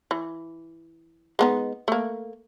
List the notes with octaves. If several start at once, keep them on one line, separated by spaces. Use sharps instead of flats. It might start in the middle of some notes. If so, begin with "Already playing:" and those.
E3
G#3 B3 D#4
A3 A#3